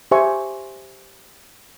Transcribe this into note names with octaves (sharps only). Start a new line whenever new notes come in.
G4 C5 E5 G#5 C#6